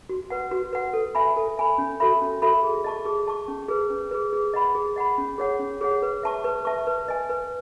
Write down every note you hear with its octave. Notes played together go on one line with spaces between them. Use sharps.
F#4
B4 F#5
F#4
B4 F#5
A4
E5 G#5 B5
A4
E5 G#5 B5
C#4
F#4 A4 E5 B5
C#4
F#4 A4 E5 B5
G#4
D#5 A5 C#6
G#4
D#5 A5 C#6
C#4
G#4 B4
C#4
G#4 B4
G#4
D#5 F#5 B5
G#4
D#5 F#5 B5
C#4
G#4 C#5 F#5
C#4
G#4 C#5 F#5
B4
E5 A5 C#6
B4
E5 A5 C#6
B4
D#5 G#5
B4